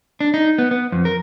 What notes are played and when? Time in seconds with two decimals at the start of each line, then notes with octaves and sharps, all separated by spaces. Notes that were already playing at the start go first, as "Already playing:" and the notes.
0.21 D4
0.34 D#4
0.58 B3
0.71 B3
0.92 F2
1.05 A#4